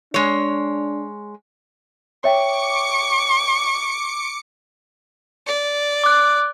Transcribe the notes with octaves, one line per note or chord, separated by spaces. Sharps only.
G#3 D4 C#5
C#5 E5 G5 C#6 D6 C#7
D5
D6 F#6